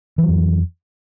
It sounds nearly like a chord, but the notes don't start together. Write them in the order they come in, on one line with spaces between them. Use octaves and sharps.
E3 F#3 F2